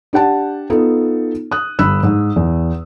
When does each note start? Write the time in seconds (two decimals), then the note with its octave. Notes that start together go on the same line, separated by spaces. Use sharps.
0.13 D4 G4 F#5 A5
0.70 B3 D#4 F4 A4
1.51 D#6 F#6
1.79 G1 B5 E6 F#6
2.03 G#2
2.36 E2